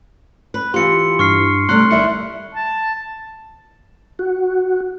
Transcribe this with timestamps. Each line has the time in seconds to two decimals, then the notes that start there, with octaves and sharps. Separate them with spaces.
0.54 B4
0.74 E3 F4 G4 C6 C#7
1.19 G2 C#6 F6 C7
1.69 C3 G3 A3 C6 F#6
1.91 A1 D#3 G3 E4 E5 C#7
2.55 A5
4.19 F#4